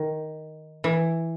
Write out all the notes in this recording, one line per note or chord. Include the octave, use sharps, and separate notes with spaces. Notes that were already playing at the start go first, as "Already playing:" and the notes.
Already playing: D#3
E3